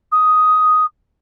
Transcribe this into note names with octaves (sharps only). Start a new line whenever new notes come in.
D#6